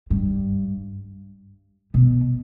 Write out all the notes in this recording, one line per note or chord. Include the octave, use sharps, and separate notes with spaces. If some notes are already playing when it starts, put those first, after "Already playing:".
G2
B2